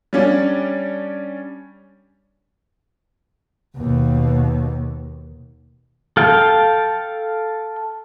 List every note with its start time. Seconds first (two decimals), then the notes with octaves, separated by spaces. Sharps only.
0.13 G3 C#4 D4
3.76 D#2 B2
6.17 A4 F5 G5 A5